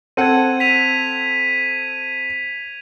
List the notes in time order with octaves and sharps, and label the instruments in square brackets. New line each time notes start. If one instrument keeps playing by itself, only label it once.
[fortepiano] C4 A4 F#5 [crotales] G#6 D#7
[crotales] B6 D#7 F7